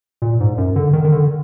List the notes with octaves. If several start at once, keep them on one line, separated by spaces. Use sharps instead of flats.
A#2
G#2
F#2
D3
D#3
D#3
D3